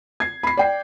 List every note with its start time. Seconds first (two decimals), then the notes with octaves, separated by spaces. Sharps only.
0.20 G#6 C7
0.43 B5 C7
0.57 D5 G5 C7